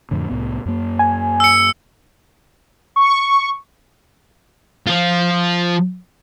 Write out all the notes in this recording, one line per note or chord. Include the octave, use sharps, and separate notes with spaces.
F2 A2 D3
C2 A2 B3
F#2 A#3
G#5
E6 C#7
C#6
F3 F4